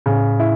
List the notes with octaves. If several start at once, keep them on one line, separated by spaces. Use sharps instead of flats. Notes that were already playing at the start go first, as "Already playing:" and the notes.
A2 C#3
E4